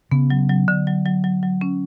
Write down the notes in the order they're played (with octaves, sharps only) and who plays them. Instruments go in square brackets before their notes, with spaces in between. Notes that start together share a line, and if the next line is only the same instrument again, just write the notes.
[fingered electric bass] C#3 [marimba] B3
[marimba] F#3
F#3
D3
F#3
F#3
F#3
F#3
C#4